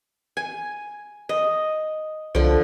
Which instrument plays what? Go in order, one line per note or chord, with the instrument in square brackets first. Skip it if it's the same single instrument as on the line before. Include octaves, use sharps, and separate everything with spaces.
[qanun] G#5
D#5
[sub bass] C2 [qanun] D3 F3